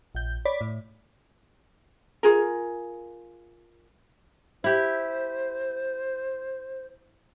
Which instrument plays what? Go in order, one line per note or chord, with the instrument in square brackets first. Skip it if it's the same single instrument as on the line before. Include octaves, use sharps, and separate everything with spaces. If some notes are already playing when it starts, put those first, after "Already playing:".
[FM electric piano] A#1 G6
C#5 D5 B5 D6 B6
A2
[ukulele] F4 G#4 A#4
[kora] E4 G4 [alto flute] C5